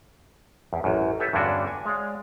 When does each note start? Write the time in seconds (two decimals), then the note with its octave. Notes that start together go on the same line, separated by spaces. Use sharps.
0.73 E2
0.84 A1 F#2
1.20 G4 A4 B4 C#5 E5
1.33 E2 G2 D3 C#4 D4 F#4
1.67 G#5
1.85 G#3 C#5 D5 F5